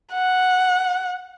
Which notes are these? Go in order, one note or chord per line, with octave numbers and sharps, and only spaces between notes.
F#5